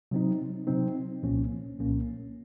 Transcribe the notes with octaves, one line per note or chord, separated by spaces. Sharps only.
C3 F#3 C4 D#4
C3 F#3 C4 D#4
C2 A#2 F3 A#3 C#4
C2 A#2 F3 A#3 C#4